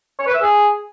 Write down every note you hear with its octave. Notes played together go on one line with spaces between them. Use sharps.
C#5
B4
E5
G#4